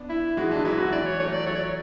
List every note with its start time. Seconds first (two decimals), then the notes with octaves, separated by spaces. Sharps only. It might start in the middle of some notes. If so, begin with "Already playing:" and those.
Already playing: B3 D4
0.09 E4
0.37 E3 G#3 F#4
0.51 E3 D4
0.65 F#3 E4
0.78 E3 F#4
0.92 E3 D5
1.06 C#5
1.20 F#3 A3 C#5
1.33 D5
1.47 F#3 C#5
1.55 D5
1.64 C#5